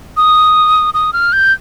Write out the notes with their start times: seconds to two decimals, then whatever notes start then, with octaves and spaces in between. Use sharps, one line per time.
0.17 D#6
0.94 D#6
1.13 F6
1.33 G6